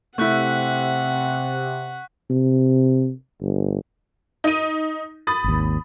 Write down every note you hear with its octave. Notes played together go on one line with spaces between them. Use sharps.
C3 A3 E4 F#5 C#6 F#6 B6
C3
G1
D#4 D#7
B5 D#6 A6
G#1 D#2